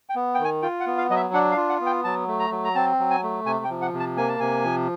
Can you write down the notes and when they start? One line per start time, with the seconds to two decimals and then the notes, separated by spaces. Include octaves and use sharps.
0.09 G5
0.15 B3
0.35 D#3 G5
0.44 G#5
0.62 F4 G5
0.80 F#5
0.86 B3
0.98 F5
1.10 F#3 D#5
1.16 E5
1.34 D4 F#5
1.52 F5
1.57 F4
1.69 F#5
1.81 B3
1.86 G5
2.04 F#3 A5
2.28 A3
2.39 A#5
2.51 F#3
2.64 A#5
2.75 C4 A5
2.99 F#3
3.10 G#5
3.23 A3
3.46 C3 G#5
3.64 G5
3.70 F3
3.82 F#5
3.94 C3
3.99 A5
4.17 A#3 G#5
4.28 A5
4.40 C3 G#5
4.64 F3